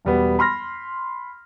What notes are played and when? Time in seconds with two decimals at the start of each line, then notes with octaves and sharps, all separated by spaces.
0.05 E1 G3 B3
0.39 B5 C6 F6 A#6